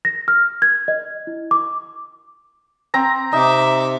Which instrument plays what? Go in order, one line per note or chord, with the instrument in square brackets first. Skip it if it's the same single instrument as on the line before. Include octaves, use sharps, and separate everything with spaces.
[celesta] A#6
F6
G#6
D#5
E4
D6
[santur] C4 A#5
[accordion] C3 [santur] D#4 [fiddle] E5 D6